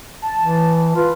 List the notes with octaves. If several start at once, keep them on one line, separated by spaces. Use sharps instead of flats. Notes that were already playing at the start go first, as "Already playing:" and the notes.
A5
E3
F4 B4